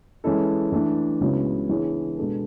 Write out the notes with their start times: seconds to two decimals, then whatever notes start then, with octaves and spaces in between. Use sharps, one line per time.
0.24 E3 G#3 C#4 E4 A4
0.72 E3 A3 D4
1.21 C#2 C#3 F#3 B3 E4
1.69 E3 B3 D4 G#4 C#5
2.17 B2 G#3 B3 D4 A4